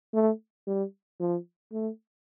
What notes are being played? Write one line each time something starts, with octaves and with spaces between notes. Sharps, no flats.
A3
G3
F3
A3